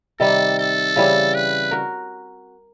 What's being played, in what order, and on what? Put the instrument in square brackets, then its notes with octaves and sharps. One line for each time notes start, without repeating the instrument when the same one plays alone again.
[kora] C3 D#3 G3 [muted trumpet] A4
[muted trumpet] A4
[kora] C#3 E3 G3 C4
[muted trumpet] B4
[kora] F#4 A#4